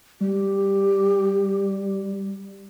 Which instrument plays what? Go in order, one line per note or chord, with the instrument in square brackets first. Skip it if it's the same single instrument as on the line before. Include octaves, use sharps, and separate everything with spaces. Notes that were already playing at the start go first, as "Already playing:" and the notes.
[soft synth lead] G3 [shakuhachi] G4